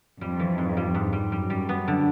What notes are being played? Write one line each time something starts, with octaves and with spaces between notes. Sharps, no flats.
F2 G3
E3
G#2
G3
G#2
G3
F#2 G3
G3
B3
D3